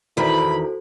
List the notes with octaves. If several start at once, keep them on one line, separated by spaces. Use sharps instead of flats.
E2 D#3 E4 F#4 A4 C5 B5